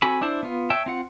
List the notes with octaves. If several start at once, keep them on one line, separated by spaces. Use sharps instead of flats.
C4 F#4 A4 G#5 B5
D4 E4 C5 A5
B3 F4
C#5 E5 G5 A5
C4 F4 F#5